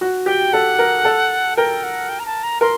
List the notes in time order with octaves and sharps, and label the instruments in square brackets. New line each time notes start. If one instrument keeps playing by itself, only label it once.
[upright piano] F#4
[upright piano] G4 [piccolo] G5
[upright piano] A4 [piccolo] F#5
[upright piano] A#4
A4
[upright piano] A#4 [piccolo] G5
[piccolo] F#5
G5
A#5
A5
A#5
[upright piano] A#4 [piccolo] C6